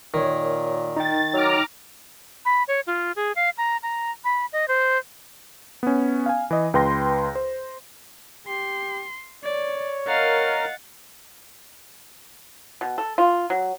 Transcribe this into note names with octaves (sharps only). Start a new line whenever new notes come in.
A#2 D#3 A#4 C#5
D#4 G5 A6
F#3 A#5 D6 F6
B5
C#5
F4
G#4
F5
A#5
A#5
B5
D#5
C5
B3 C#4
F5 G#5
E3 D#5
C#2 B4 G5 C6 A#6
C5
G4 C6
C#5 D5
A#4 D#5 F5 F#5 A6
B2
A4
F4
F#3